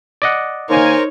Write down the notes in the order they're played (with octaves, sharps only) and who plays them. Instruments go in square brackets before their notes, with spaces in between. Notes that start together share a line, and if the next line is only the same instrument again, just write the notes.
[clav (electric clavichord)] D5 D#5 F#5
[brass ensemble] D#3 A#3 G#5 [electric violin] D#4 C#5 [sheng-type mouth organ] A#4 C5